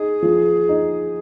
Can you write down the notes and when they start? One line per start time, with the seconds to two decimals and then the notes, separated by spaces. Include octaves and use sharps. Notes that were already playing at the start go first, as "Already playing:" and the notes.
Already playing: D#4 G#4
0.22 F3
0.69 D#4